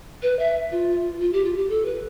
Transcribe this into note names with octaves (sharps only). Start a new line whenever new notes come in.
B4
E5
F4
F4
G4
F4
G4
A4
B4